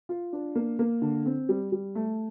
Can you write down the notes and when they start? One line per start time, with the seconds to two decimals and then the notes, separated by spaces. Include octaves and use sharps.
0.09 F4
0.33 D4
0.55 A#3
0.79 A#3
1.02 D3
1.26 C4
1.49 G3
1.72 G3
1.95 A3